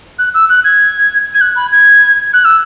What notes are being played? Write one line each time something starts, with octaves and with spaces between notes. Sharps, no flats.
F#6
E6
F#6
G#6
G#6
F#6
B5
G#6
F#6
E6